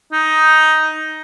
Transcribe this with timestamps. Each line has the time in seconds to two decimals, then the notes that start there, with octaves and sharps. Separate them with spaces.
0.12 D#4